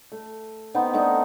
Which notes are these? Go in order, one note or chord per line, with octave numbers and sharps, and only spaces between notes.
A3
B3 C4 D#4
A3 D4 D#4